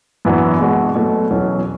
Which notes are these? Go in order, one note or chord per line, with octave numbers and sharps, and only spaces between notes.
F#2 E3 B3 D4 F#4
B2 G#3 D4 F#4
B2 F#3 A3
E2 B2 F#3 C#4 F#4